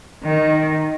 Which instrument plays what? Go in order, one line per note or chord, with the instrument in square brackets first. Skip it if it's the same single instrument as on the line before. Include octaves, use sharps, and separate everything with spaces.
[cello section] D#3